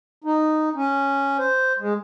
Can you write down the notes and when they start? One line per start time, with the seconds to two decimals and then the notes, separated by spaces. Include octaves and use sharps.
0.24 D#4
0.75 C#4
1.39 C5
1.79 G#3